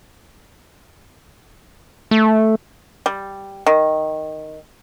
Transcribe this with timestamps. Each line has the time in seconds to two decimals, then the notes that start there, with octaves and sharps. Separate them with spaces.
2.11 A3
3.06 G3
3.66 D#3